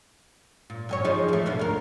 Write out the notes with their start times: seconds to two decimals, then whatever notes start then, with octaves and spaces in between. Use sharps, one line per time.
0.70 A#2
0.89 F#2 G#4 C#5
1.04 F3 D#4 G#4
1.28 E3 A3
1.46 B2 D3 F3
1.59 D2 A#4